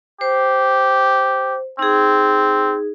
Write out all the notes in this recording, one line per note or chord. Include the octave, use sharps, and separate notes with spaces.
G4 C5
C4 D#4 G#4